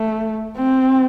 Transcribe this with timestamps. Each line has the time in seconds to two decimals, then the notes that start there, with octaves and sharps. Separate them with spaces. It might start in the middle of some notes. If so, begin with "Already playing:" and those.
Already playing: A3
0.57 C4